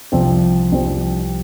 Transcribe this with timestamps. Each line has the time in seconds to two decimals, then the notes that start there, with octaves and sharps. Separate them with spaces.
0.12 C2 C3 F3 C4
0.72 C2 C3 F3 C4